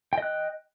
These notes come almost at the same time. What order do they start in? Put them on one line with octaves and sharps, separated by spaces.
G5 D#5 F#6